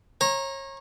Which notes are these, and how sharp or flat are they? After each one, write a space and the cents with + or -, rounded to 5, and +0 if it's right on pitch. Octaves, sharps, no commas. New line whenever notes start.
C#5 -30 A#5 +10